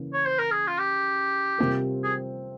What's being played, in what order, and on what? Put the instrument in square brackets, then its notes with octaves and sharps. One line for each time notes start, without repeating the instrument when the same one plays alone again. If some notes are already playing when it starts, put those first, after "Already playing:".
Already playing: [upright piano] C#3 E3 A#3
[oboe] C#5
C5
A#4
G#4
F4
G4
[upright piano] C3 G3 C4 F4 A#4
[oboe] G#4